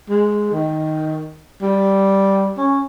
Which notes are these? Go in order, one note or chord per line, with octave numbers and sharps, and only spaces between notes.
G#3
D#3
G3
C#4